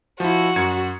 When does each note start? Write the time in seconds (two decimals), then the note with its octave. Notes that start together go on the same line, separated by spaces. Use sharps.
0.20 F3 E4 F#4
0.56 F#2 G#6 C#7